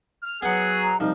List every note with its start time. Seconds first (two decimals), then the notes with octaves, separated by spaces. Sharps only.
0.23 F6
0.42 F#3 B3 G#4 F#5
0.83 A#5
1.00 C2 F3 D#4